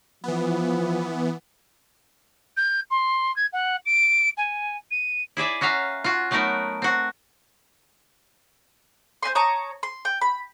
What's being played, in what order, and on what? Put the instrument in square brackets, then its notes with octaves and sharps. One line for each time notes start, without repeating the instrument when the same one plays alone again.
[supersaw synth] E3 B3 [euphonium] F3
[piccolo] G6
C6
G#6
F#5
D7
G#5
D#7
[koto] E4 G#4 D5 E5
C#4 F#4 E5 F5 A#5
F4 F#4
F#3 A3 B3 D#4 A#4
C4 F#4
[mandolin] C5 D#5 G#5 C6
C#5 A5 A#5 D#6
C6
G5
B5